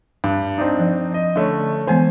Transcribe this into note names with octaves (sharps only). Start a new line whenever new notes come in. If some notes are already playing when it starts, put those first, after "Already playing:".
G2
C4 D4 D#4
F3
D#5
D3 A3 C#4 E5
E3 G#3 B3 C5 G#5